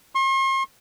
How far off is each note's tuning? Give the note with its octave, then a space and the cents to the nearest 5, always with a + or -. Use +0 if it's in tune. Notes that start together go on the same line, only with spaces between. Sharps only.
C6 +45